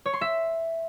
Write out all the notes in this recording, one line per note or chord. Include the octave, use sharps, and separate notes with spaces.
C#5
C6
E5